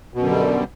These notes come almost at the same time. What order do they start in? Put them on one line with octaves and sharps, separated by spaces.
B2 F#2 D3 G3